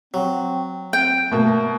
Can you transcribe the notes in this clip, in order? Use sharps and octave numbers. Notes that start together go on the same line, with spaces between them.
F#3 C4
C4 G5
B2 A3 A#3